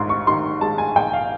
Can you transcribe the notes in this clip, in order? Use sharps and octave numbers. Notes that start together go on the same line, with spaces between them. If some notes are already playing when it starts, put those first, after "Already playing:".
Already playing: A#1 G#2 C6
C#6
D#3 C6
G#3 A5
G#5
A#1 G5
F5